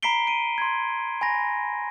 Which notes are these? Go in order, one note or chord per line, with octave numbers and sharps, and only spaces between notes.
A#5 B5 B6 C7 D7 G7
D7 D#7
C6 G#6
G#5 B5 A#6